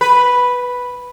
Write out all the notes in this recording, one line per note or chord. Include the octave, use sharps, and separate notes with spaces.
B4